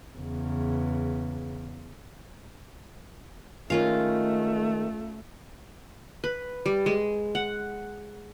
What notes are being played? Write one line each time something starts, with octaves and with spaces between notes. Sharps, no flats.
E2 C#3
D#3 G#3 A3 C#4 F4 F5
B4
G3
G#3
F#5